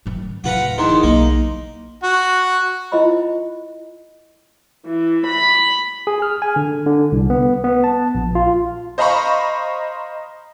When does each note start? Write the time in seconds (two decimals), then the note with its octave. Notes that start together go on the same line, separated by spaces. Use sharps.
0.06 D#3 F#3
0.44 D1 D3 F4 B4 F#5 A#5
0.78 E2 D#3 D#4 C6
1.03 B1 A#3 D#5
2.03 F#4
2.92 E4 F4 C5 D#5 B5
4.86 E3
5.26 B5
6.07 G#4
6.22 F6
6.42 G#5
6.56 D3
6.86 D3
7.12 C2
7.30 B3
7.64 B3
7.84 A5
8.15 A#1
8.35 F4
8.98 C5 D#5 F5 A#5 B5 C#6